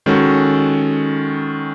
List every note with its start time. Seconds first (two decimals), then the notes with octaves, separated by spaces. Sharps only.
0.06 D#3 G#3 C#4 F#4 A4